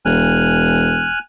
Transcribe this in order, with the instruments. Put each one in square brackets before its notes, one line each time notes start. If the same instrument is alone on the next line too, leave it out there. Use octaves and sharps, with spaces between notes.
[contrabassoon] E1 [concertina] G#5 F6 F#6